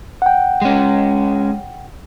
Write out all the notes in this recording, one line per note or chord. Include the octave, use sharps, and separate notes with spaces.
F#5 G5
G#3 C#4